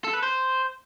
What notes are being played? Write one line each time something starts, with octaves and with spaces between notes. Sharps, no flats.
A4
B4
C5